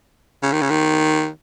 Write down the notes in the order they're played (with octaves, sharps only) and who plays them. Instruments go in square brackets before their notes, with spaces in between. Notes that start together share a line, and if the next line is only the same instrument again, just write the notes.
[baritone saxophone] C#3
D#3
C#3
D#3